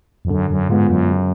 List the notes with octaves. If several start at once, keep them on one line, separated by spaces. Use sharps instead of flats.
F2
F#2 D3
F#2
G#2 G#3 B3 F4
F#2
C#3